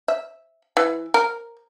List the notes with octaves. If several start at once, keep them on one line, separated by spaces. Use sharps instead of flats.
E5
E3
A#4